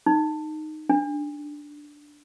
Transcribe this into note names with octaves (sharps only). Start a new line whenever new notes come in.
D#4
D4